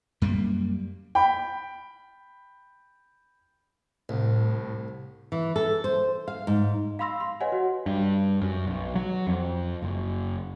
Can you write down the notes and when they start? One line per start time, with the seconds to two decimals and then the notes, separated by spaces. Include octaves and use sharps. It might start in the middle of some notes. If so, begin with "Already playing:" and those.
0.22 F#2 G3 A#3
1.15 G5 B5
4.09 C2 A2
5.32 E3
5.56 A4
5.84 C5
6.28 F5
6.47 G#2
6.99 F5 B5 C6 E6 A#6
7.20 C6
7.40 B4 C#5 D#5 F#5 G#5
7.52 F#4
7.86 G2
8.41 F#2
8.66 B1
8.95 F#3
9.27 F2
9.82 F#1